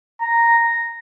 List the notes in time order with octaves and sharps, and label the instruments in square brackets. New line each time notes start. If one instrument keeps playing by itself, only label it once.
[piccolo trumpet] A#5